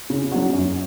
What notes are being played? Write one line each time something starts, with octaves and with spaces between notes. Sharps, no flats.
C#3
F#3 C#4 F#4
F#2